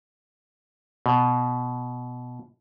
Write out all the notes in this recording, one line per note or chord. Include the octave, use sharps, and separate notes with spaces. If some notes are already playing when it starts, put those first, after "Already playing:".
B2